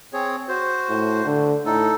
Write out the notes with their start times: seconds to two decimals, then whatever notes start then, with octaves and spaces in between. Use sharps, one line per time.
0.13 C4 G#4 C#5
0.48 F#4 C5
0.89 A2
1.26 D3
1.66 A2 D#4 A4